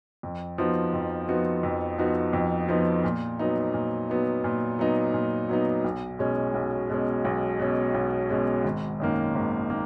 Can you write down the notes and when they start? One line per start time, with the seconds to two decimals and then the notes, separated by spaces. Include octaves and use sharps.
0.23 F2
0.58 F3 B3 D#4 F#4
0.93 F2
1.28 F3 B3 D#4 F#4
1.63 F2
1.98 F3 B3 D#4 F#4
2.33 F2
2.68 F3 B3 D#4 F#4
3.04 A#2
3.39 F#3 B3 D#4
3.74 A#2
4.09 F#3 B3 D#4
4.44 A#2
4.79 F#3 B3 D#4
5.14 A#2
5.49 F#3 B3 D#4
5.84 B1
6.19 B2 G#3 C#4
6.54 B1
6.90 B2 G#3 C#4
7.25 B1
7.59 B2 G#3 C#4
7.94 B1
8.29 B2 G#3 C#4
8.64 G#1
9.00 F#2 D#3 A#3
9.35 G#1
9.70 D#3 A#3